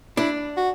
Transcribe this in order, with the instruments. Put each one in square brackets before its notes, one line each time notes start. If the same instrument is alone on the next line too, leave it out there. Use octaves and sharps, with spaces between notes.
[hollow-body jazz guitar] D4 [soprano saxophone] E4
[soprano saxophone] F#4